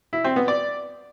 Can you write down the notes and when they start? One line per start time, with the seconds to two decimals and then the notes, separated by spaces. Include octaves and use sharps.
0.13 E4
0.24 C4
0.36 B3
0.48 D5